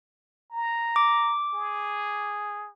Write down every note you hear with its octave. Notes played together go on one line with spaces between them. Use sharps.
A#5
D6
G#4